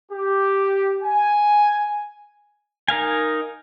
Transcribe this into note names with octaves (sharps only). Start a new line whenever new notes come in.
G4
G#5
D#4 A#4 F5 G#5